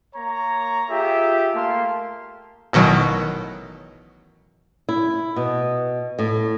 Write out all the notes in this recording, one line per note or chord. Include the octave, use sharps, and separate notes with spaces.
A#3 C#5 A#5
F4 G4 G#4 E5
A3 A#3 F5 A5 C6
A1 B2 D#3 F#3
E4
B2
A2